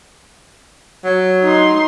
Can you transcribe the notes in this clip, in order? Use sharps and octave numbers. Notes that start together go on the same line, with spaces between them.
F#3
D#4 C6